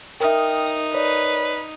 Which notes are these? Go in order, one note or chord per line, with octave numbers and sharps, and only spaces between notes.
D#4 A#4 E5 G5 D#6 F6
B4 C#5 D5